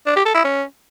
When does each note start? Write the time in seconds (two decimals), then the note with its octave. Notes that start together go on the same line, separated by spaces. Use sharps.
0.06 D4
0.16 G4
0.25 A4
0.35 E4
0.44 C#4